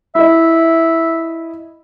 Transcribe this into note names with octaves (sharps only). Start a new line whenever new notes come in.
E4 D#5 E5